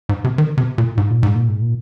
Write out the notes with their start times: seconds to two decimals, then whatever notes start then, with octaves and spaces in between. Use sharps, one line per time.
0.09 G#2
0.24 C3
0.38 D#3
0.57 C3
0.78 A#2
0.97 G#2
1.11 A#2
1.23 G#2
1.35 A#2
1.48 G#2
1.62 A#2